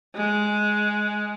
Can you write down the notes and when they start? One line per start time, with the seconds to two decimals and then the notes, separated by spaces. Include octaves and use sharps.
0.15 G#3